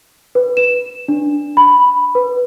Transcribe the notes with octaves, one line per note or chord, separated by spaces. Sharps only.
B4
E7
D4
B5
B4